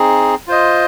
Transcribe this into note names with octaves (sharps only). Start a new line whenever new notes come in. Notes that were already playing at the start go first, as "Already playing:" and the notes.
Already playing: C4 D#4 G#4
F4 C5 D#5